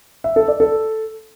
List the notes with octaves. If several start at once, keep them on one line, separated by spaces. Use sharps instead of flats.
E5
A4
D5
A4